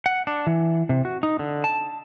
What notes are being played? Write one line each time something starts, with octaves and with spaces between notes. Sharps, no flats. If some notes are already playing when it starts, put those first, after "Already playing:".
F#5
D4
E3
C3
F#4
D#4
D3
A5